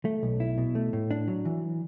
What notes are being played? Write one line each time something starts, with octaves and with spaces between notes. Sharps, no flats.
A3
B1
E4
B2
A3
A2
D4
F#3
E3